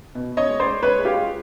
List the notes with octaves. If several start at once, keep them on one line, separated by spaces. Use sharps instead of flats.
B2
B2
C#5 D#5
G#3
C5 D5
G#3
G#3 B4 C#5
G#3
F4 G4
G#3